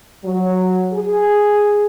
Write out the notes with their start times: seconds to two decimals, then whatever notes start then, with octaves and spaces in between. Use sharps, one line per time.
0.24 F#3
0.93 G#4